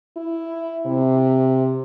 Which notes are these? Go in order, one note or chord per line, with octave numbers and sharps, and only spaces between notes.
E4
C3